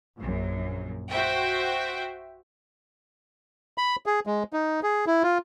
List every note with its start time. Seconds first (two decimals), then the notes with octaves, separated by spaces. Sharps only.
0.18 A#1 F#2
1.09 F#4 C5 E5 G5
3.78 B5
4.06 G#4
4.27 G#3
4.53 D#4
4.83 G#4
5.07 E4
5.23 F4